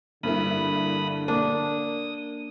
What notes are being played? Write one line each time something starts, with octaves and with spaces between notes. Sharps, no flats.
G2 D3 A#3 E4 B5 D#6
A#3 D4 D#6